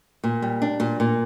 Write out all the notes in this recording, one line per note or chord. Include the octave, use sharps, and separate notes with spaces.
A#2
G3
D4
A#2
A#2